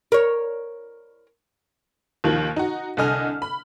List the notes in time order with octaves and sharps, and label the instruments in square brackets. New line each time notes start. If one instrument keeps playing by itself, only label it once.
[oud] A#4 C#5
[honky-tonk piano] D#2 D#3 F3
D#4 F#4
C2 D3 A4 D#5 G#5 F6
B5